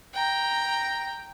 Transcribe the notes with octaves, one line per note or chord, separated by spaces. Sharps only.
G5 A#5